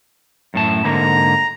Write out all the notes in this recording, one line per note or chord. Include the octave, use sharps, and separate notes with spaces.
F#2 A2 A5
G#2 D3 A#3 A#5